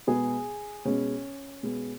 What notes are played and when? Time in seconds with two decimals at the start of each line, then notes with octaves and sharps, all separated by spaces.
0.07 B2 G#3 B3 G#4
0.85 B2 G#3 B3 C#4
1.63 B2 G#3 B3